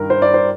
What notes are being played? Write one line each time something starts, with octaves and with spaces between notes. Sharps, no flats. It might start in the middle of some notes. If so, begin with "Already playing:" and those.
Already playing: G2 D#3 A#4
C5
D5
C5